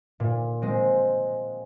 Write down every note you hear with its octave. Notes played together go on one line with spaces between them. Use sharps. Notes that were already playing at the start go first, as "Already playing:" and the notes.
A#2
G#3 C4